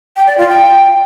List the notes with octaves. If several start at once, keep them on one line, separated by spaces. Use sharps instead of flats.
G5
D5
F4
G5